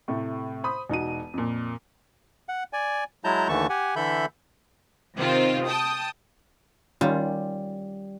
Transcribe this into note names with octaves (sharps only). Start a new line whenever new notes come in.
A2 C3 A3
C5 B5 D#6
E1 D#4 F#4 D#7
F2 A#2
F#5
D5 G#5
F#3 G#3 E4 A5 A#5 G6
D#2 D3 E3 A3 A5 C#6
G4 F#5 G#5
D3 E3 A4 E5 B5 G6
C3 D#3 C4 F4
G5 A5 D#6
D#3 G3 C#4 F4